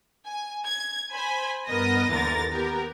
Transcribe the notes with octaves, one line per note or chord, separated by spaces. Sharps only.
G#5
G#6
C5 G#5 B5
G2 B3 A#4 D#5 D#6 A#6
D#2 D3 E3 A#4 A6 A#6
B3 G4 A#4